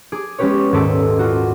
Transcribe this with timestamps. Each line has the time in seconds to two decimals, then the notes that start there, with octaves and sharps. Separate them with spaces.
0.12 G#4 D6
0.39 G#3 B3 C#4 G4 B4 C#5
0.72 D#1 G#2 A4 B4 D6 E6
1.19 F4 F#4